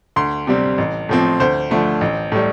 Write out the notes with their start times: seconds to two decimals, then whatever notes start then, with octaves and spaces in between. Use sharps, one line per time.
0.16 D2 C6
0.47 C3 G3 C4
0.78 A1
1.09 A2 F3 C4
1.40 D2 C5
1.70 D3 F3 A3
2.01 A1
2.32 A2 G3